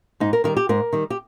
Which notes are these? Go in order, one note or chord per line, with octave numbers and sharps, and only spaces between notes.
G#2 D#4
A#4
D#3 G3 A#4
G4
G#2 A#4
D#3 G3
G4